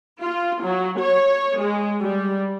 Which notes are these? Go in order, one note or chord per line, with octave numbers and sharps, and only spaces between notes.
F4
F#3
C#5
G#3
G3